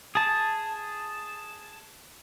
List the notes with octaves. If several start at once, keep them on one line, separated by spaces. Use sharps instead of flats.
G#4 A5